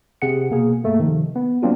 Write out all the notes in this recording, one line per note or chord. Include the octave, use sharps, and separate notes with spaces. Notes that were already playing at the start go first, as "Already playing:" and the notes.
C3 G#4 F#5 C#7
B2 A#3 G#4
G2 A3 A#3
C3 D#3 F3
B3
F#3 A#3 C4 D4 F4 F#4